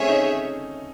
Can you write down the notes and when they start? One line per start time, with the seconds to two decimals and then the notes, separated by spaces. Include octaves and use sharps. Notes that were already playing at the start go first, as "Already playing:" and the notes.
Already playing: A3 C4 C#4 G#4 C#5 E5
0.08 D#4